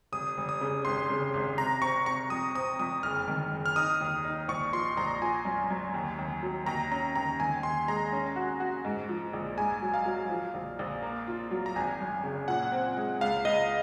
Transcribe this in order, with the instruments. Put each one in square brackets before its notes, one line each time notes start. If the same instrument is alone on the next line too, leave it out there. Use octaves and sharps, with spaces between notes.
[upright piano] F1 [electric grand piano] D#6
[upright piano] F1
[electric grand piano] D#6
[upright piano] C#3
[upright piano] G#1 [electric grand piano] C6
[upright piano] C#3
G#1
[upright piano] C3 [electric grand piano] A#5
[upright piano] C4 [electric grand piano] C#6
[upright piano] C3 [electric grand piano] C#6
[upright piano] F2 [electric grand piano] D#6
[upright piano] C4 [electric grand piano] D#6
[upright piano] F2 [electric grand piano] D#6
[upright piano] F#1 [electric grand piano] F6
[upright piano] D#3
F#1
[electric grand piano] F6
[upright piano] D#4 [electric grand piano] D#6
[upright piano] D#2
D#4
[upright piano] A#1 [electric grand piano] C#6
[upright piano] F3 [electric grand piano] C6
[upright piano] A#1 [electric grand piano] A#5
[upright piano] F3 [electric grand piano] G#5
[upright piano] F#2
F#2
D#2
D#2
F#3
[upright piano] D#2 [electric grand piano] A#5
[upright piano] C#4 [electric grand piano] A#5
[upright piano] D#2 [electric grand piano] A#5
[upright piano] D#3 [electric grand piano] G#5
[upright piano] D#2 [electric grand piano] C6
[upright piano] G#3 [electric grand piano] A#5
[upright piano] C#4
F#4
F#4
G#2
F3
A#1
[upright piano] G#2 [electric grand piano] G#5
[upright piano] F#3
[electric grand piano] F5
[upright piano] F#3
F3
A#1
A#1
A#3
F4
F#3
[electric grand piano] A#5
[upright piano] G#1 [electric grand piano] G#5
[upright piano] F#2
C#3
[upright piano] A#2 [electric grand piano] F#5
[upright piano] C4
G#3
[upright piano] C#2 [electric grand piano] F5
[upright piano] C#2 [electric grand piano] D#5